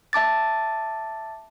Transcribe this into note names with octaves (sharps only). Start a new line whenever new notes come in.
E5 A5 D6 A6